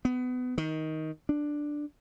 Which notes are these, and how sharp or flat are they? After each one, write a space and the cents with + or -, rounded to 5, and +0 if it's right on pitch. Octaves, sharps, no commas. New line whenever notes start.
B3 +25
D#3 +15
D4 +5